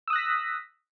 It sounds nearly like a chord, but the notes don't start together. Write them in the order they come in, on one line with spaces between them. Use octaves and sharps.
E6 D#6 F#6 A#6 B6